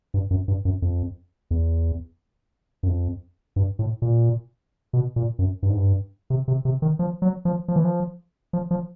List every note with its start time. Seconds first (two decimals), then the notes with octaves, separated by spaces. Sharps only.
0.14 G2
0.31 F#2
0.48 G2
0.65 F#2
0.82 F2
1.51 E2
2.83 F#2
2.88 F2
3.56 G2
3.79 A2
4.02 A#2
4.93 B2
5.16 A#2
5.39 F#2
5.63 G2
5.70 G#2
5.77 G2
6.30 C3
6.48 C3
6.65 C3
6.82 D#3
6.99 F3
7.22 F#3
7.45 F3
7.68 F3
7.76 E3
7.85 F3
8.53 F3
8.71 F3